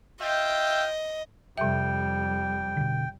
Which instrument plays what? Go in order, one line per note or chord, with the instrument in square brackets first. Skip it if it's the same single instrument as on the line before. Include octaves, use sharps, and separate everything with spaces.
[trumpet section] F4 E5 G5 [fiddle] D#5
[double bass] F2 G3 [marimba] C3 E5 [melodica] G5
[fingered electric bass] B2 D3